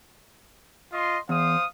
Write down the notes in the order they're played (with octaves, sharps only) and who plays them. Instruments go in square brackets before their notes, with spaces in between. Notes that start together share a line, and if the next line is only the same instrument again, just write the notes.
[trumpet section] F4 D#5 C6
[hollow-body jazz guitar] E2 [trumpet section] C5 F5 D#6